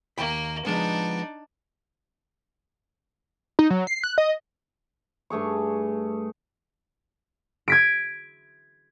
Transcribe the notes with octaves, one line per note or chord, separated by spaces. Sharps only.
D#2 A#3 G5 B5
F3 G#3 B3 D4 D#4
D#4
F#3
C7
F#6
D#5
G2 A3 G#4 C#6
G#6 B6 D7